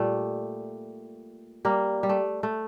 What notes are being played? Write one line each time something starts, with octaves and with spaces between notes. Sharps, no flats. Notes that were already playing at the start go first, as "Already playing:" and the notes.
Already playing: A#2 G3 A3
G3 A#3
G3
A3
A3